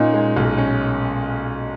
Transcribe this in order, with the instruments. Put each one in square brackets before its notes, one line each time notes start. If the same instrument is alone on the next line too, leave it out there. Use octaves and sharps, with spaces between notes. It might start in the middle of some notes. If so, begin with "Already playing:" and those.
Already playing: [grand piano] A#2 C#4 [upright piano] D#4
[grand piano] G#3
B1
C#4